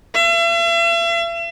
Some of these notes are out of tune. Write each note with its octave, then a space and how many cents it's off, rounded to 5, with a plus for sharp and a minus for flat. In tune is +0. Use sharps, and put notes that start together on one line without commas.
E5 +45